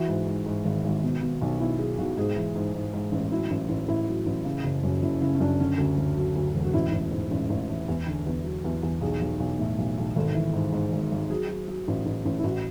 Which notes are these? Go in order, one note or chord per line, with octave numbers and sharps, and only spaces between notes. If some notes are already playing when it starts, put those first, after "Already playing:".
Already playing: E3 F#4
G#2
G#2
G#2
G#1
G#1
B2
B2
B1
B2 E4
F#3 G#4
B1 F#4
G#2 G#4
E3
G#2
G#2
G#2
A1
F#3 E4
A1
A1
A1 E4
F#3
A1
C#3
F#1
F#2
F#1 E4
C#3 E4
C#4
F#2 D4
D3 C#4
D2
D2
F#3
D2
E1
F#4
A1 E4
A1
G#2
A1
A1
E3
E2
D3
E2
F#3
E2
E2
B1 G#4
B1
B1
A2
B1
B1
G#1 A4
E3
G#2
G#2
G#1
G#1
F#3 G#4
F#3
F#3
A1
A1
A1
E4
A1 F#4